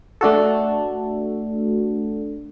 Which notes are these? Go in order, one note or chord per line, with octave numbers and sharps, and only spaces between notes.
A3 D4 F#4 A4